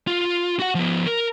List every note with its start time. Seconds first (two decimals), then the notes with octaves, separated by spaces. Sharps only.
0.07 F4
0.60 F#4 F#5
0.75 F3 B3
1.06 A#4